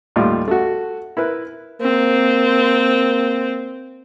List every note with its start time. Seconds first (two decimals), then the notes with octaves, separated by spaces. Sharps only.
0.16 D#2 A2 G3 F4
0.48 A3 F#4
1.17 E4 A#4 B4
1.81 A#3 C4